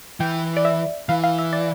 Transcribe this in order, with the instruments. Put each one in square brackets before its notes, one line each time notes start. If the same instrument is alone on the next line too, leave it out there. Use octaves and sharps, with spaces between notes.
[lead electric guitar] E3 [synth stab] G5
[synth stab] D5
E5
[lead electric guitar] E3 [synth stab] F5
[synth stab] F5
E5
D5